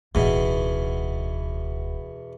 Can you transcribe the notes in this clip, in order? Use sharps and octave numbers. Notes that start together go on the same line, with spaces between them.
D1 E2 B2 D#4